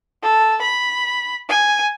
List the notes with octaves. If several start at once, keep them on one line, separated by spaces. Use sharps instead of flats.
A4
B5
G#5